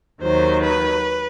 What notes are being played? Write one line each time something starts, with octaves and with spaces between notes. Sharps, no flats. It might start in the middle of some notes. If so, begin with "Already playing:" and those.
D#2 D#3 F#3 C5
B4